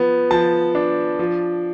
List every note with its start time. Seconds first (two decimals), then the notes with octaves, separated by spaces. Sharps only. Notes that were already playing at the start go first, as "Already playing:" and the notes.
Already playing: F3 B3
0.31 F3 A5
0.75 D4
1.19 F3